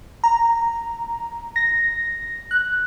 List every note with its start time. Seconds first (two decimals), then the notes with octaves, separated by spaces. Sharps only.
0.24 A#5
1.56 A#6
2.51 F#6